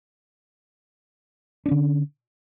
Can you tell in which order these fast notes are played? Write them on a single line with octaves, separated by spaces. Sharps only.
D4 C#4 D3